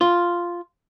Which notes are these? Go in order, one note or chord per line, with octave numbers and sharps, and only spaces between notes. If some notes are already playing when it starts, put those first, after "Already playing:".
F4